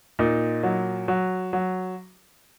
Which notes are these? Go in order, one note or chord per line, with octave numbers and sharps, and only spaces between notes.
A#2 D#4
F#3
F#3
F#3